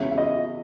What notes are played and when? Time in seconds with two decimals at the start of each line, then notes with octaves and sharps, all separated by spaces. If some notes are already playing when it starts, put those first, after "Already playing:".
Already playing: E2 C#3 G#3 C#4 E5
0.11 E5
0.18 D#5